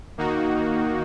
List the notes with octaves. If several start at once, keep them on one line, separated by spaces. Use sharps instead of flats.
D#3 A#3 D#4 F#4